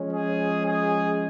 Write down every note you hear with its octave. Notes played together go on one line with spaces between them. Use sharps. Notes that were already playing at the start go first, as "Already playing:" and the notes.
Already playing: F3 G#3 C#4
G#4
G#4